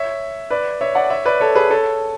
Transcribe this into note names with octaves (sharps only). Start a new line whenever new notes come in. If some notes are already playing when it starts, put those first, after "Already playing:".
Already playing: C#5 E5
B4 D5
C#5 E5
D5 F#5
C#5 E5
B4 D5
A4 C#5
G#4 B4
A4 C#5